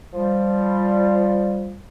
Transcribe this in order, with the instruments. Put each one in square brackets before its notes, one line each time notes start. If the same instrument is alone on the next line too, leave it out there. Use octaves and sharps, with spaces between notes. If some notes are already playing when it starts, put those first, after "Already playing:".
[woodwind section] F3 G3